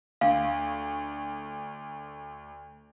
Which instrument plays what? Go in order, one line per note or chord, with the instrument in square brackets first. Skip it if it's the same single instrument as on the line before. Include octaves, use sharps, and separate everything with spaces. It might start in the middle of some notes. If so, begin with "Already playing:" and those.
[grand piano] D2 [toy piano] F5